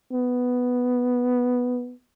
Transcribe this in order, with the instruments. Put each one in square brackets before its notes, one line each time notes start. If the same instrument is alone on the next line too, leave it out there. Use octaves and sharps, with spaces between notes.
[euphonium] B3